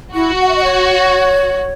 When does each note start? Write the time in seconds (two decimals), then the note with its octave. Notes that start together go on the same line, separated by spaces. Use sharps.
0.15 E4 F#4
0.41 F#5
0.49 E5
0.56 D#5
0.64 C#5